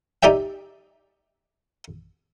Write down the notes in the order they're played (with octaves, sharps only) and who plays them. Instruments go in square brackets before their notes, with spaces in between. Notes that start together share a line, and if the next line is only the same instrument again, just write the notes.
[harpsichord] D#4 G4 D5 E5 G5